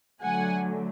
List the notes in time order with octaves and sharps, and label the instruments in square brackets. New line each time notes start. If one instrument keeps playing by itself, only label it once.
[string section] D3 F#3 A3 F#5 G#5